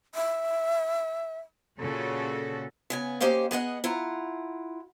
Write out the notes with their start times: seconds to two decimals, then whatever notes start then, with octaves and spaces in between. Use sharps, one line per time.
0.15 E5
1.80 A#2 C#3 F#4 A4
2.90 C#3 B3 G#5
3.21 A#3 C#4 G4 C5 D#5 F5
3.51 B3 G#4 D#5 F#5
3.84 E4 F4 F#5 A#5